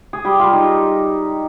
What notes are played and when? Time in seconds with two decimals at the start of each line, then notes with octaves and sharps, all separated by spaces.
0.13 G#4
0.25 G3 G4
0.39 G3 F4
0.53 D#4